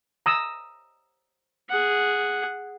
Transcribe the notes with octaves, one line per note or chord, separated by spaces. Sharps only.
A#5 D#6 E6
G#4 F#5